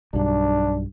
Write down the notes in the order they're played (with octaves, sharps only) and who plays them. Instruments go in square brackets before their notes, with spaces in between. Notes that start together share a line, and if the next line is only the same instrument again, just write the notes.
[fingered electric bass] B1 G2 [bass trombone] D4